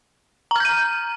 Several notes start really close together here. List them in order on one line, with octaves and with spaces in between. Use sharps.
A#5 F6 G6 D#7